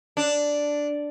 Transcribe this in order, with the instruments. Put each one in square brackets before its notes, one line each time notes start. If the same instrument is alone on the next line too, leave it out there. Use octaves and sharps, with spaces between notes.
[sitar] D4